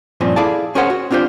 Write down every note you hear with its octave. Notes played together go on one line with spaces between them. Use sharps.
G2 A#2 F3 C4 C#4
E4 G#4 A4 D5 F5 A5
C#4 G#4 A#4 C5 C#5 F#5
F#4
C4 D4 F4 G4 C5